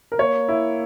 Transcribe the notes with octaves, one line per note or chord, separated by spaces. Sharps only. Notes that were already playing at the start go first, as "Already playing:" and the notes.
A#4
A#3 C#5
E4